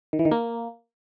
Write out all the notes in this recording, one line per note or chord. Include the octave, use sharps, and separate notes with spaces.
D#3
E3
D#3
A#3